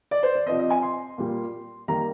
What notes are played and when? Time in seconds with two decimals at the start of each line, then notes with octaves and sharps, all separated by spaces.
0.11 D5
0.23 C5
0.35 D5
0.46 C3 F3 C4 D#5
0.59 D#5
0.70 G#5
0.82 C6
1.18 A#2 G3 A#3
1.88 D#3 G3 A#3 A#5